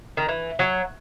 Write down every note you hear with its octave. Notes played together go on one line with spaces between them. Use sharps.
D#3
E3
F#3